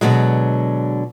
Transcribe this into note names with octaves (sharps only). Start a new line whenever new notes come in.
B2 D3 F#3 G#3